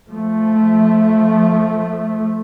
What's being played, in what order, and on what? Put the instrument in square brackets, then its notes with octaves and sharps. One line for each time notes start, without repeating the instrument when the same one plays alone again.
[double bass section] F3 A3